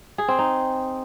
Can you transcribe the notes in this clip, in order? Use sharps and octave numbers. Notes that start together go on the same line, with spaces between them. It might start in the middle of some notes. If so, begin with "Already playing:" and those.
G#4
C4
D#4